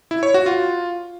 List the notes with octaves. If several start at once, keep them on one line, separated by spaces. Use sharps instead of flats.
E4
C#5
F#4
F4